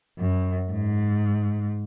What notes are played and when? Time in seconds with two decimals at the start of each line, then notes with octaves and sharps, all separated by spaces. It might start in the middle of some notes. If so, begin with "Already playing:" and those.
0.19 F#2
0.73 G#2